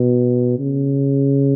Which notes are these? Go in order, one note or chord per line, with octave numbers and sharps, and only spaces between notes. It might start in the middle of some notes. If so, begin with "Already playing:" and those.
Already playing: B2
C#3